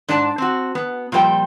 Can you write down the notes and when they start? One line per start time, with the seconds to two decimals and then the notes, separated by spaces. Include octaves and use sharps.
0.09 G#2 D4 D5 A5
0.38 C4 F#4
0.75 B3
1.12 A#2 F3 G3 C5 G5